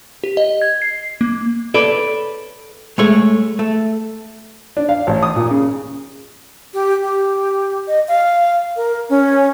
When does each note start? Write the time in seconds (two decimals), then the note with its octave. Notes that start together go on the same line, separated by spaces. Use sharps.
0.24 G4
0.37 D#5
0.62 G#6
0.82 C7
1.21 A#3
1.74 A4 B4 C#5 D5
2.98 G#3 A3 C#5
3.59 A3
4.77 D4
4.89 F5
5.07 A1
5.23 D#6
5.36 A#2
5.51 C#3
6.74 G4
7.03 G4
7.87 D#5
8.08 F5
8.76 A#4
9.09 C#4